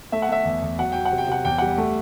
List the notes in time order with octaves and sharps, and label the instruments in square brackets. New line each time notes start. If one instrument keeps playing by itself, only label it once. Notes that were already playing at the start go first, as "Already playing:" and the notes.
[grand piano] A3 E5
F#5
A3 E5
E2
E2
F#3 F#5
F#3 G5
F#5
C3
G5
C3 F#5
E2 G5
G3 F#5
A3